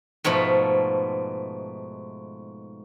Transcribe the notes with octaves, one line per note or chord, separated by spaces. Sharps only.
G#2 B2 F3 A3